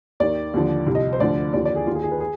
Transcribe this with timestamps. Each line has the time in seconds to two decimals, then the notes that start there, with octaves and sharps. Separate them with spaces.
0.20 D#2 D#3 D5
0.54 D#2 D3 F3
0.87 C2 C3 F3
0.95 D#5
1.13 C5
1.20 D2 D3 F3 D5
1.53 D#2 D3 F3 D5
1.65 D5
1.76 G#4
1.86 D#2 F4
1.91 D#3 G#4
2.03 G#4
2.11 B4
2.20 G#4